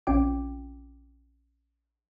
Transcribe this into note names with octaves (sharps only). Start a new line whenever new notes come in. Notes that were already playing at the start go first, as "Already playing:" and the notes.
A#1 C4 C#4 F4 G5 D6